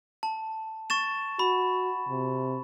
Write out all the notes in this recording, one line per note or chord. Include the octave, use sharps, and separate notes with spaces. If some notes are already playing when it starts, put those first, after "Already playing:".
A5
C#6 A6 E7
F#4 B5
C3